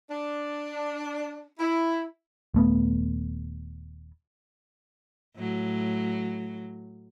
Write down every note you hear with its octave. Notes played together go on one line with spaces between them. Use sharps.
D4
E4
D#1 A3 B3
A2 F#3